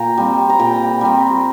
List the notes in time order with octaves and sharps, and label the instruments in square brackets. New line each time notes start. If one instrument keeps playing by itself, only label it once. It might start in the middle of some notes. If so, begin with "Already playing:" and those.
Already playing: [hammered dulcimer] A#2 G5 A#5
G3 C4
A#5
A#2 G5
G3 C4